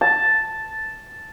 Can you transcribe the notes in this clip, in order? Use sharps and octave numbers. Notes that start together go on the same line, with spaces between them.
A5